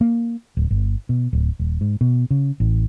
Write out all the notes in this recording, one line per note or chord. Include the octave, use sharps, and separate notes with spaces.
A#3
D1
G1
B2
D1
D#1
G#2
B2
C#3
A1